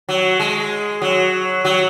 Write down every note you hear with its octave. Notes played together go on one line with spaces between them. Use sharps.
F#3
G#3
F#3
F#3